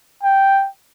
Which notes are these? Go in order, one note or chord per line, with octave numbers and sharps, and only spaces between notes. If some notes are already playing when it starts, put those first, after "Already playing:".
G5